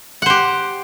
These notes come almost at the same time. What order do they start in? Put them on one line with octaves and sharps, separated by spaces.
F#5 C5 G4